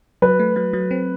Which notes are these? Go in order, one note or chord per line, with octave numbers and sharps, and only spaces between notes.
F#3 B4
A3
F#3
F#3
C4